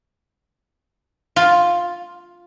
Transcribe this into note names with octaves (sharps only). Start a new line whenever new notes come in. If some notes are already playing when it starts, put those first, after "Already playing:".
F4